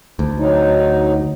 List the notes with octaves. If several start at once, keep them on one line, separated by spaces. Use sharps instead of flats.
D2
F#3 D#4